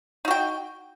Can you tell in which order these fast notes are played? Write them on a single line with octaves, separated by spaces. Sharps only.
D#4 F#4 G5